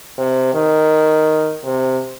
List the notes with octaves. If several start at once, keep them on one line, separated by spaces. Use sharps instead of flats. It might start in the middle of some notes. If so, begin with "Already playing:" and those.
C3
D#3
C3